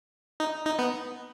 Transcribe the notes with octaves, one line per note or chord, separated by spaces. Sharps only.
D#4
D#4
B3